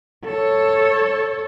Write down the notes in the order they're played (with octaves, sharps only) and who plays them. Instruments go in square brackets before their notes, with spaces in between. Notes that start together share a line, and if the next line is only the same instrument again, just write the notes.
[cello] A4 C#5